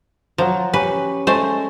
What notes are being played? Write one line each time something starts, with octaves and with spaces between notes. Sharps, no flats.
F3 F#3 A#4
C#4 G4 B4
G#3 A3 C5